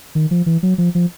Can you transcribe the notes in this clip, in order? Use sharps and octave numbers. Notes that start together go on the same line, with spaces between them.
D#3
F3
E3
F#3
F3
F3